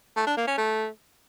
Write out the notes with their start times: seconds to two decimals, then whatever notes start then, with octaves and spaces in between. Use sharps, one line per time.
0.16 A3
0.27 D4
0.37 A#3
0.47 C#4
0.58 A3